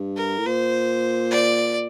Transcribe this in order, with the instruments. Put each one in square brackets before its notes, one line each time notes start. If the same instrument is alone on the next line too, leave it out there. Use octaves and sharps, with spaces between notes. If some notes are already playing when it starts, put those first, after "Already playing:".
Already playing: [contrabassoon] G2
[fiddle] A#4
[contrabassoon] A2
[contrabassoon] A#2 [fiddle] C5
[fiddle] D5